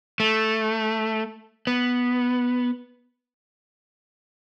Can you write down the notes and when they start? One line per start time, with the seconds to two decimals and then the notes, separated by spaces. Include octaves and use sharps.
0.20 A3
1.67 B3